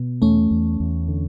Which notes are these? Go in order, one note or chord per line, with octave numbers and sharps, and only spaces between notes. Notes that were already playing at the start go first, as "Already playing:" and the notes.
Already playing: B2
E2 A3 C#4
E2
E2
D3